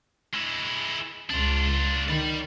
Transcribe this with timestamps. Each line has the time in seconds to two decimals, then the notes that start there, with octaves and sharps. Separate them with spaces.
0.34 G#3 E4
1.30 C#2 D4 F4
2.08 D#3 D5 B5